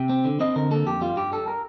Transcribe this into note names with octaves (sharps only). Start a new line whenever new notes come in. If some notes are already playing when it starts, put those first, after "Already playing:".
Already playing: C3 G5
C4
D3
C4 D#5
D3 A#4
A#3 A4
F2 G4
G3 F4
G2 G4
G3 A4
A#4